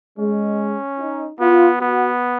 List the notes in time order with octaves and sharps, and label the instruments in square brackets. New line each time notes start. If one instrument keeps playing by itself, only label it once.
[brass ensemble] G#3 [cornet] C#4
[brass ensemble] D#4
[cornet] B3 [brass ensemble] F4
[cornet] B3 [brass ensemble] F#4